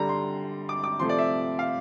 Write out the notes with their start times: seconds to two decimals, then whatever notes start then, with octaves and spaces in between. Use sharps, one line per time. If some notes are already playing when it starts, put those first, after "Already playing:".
Already playing: D3 G3 A#5
0.09 C6
0.69 D6
0.84 D6
0.99 C3 F3 A3 C6
1.09 D5
1.18 E5
1.59 F5